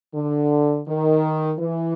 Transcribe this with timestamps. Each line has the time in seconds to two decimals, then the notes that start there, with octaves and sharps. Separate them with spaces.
0.15 D3
0.88 D#3
1.59 E3